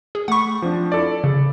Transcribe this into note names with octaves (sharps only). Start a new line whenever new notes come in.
G#4
A3 F#5 B5 C#6
F3 C4 D4
E4 A4 D5
C#3